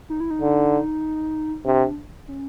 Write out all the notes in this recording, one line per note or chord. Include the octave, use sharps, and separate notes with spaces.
D#4
E4
D#4
D3
C3 D4
C#4